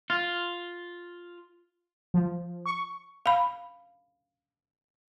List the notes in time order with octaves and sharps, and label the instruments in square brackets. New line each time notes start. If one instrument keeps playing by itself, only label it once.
[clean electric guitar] F4
[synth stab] F3
C#6
[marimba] F5 B5